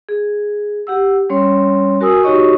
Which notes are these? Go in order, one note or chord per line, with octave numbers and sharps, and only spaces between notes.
G#4
G4 F#5 E6
G3 C#4 C#5 C6
F#4 A#4 G#5 D#6 E6
D#4 F#4 G4 C#5 D#5 C#6